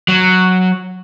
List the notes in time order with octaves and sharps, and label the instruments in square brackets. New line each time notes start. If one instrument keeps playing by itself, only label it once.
[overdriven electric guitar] F#3